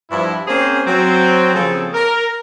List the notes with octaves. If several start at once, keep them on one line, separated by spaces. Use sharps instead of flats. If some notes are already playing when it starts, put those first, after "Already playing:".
G2 F3 E4
A#3 C4 C#4 G#4 C5
F#3 C4
C#3 F3 A#3 C4 G#4 A4
A#4